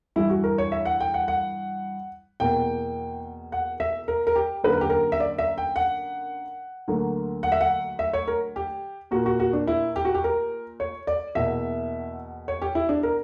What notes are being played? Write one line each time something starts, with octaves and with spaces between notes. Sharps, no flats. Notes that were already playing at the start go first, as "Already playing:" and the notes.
G2 E3 G3 E4
F#4
A#4
C#5
E5
F#5
G5
F#5
F#5
E2 B2 A#3 G5
F#5
E5
A#4
A#4
G4
F#2 D3 A#3 B4
A#4
G4
A#4
E5
D5
E5
G5
F#5
D2 D3 F#3 A#3
F#5
E5
F#5
E5
C#5
A#4
G4
A#2 A#3 F#4
F#4
F#4
D4
E4
G4
F#4
G4
A#4
C#5
D5
E2 B2 A#3 E5
C#5
G4
E4
D4
A#4